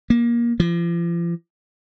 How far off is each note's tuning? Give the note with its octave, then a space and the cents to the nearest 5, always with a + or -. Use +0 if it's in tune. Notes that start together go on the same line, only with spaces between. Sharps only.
A#3 +20
F3 -40